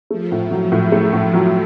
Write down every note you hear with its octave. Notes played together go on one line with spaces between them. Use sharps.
F3 A3
A2
F#3
A2
A3
A2
F#3